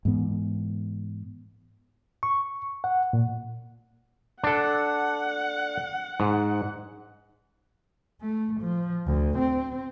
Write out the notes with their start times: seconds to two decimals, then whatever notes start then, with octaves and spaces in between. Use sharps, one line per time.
0.05 G#2 E3 B3
2.23 C#6
2.84 F#5
3.13 A#2
4.43 D4 A4 F#5
6.20 G#2
8.21 A3
8.61 F3
9.06 D2
9.38 C4